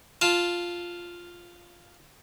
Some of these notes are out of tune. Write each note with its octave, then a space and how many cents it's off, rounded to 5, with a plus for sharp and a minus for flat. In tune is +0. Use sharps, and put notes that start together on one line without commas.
F4 +0 A5 +0